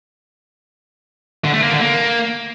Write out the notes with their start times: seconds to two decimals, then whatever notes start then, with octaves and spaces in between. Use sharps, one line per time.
1.44 D3
1.54 A3
1.63 A#3
1.72 D3
1.81 A#3